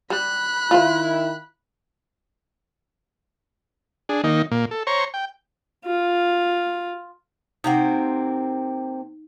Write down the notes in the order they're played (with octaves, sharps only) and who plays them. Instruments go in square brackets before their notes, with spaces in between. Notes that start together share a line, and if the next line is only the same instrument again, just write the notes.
[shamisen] G3 [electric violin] B5 F#6
[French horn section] D#3 E4 [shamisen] F4 C5
[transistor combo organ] D4 G#4
D#3 A#3 D#4
A#2 A#3
A4
C5 C#5 A#5 C#6
G5
[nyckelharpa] F4
[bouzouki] C3 A#3 C4 [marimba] D#4 F#5